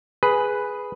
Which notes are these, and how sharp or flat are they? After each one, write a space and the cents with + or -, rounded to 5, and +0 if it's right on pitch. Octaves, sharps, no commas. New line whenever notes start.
G#4 +0 B4 +0